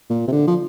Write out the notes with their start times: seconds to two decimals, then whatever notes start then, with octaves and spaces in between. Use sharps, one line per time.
0.10 A#2
0.28 C3
0.32 D3
0.47 F3